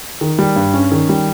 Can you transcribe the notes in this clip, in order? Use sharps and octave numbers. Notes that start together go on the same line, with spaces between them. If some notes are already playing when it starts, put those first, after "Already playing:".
D#3
G3
G2
C#4
D#3
G3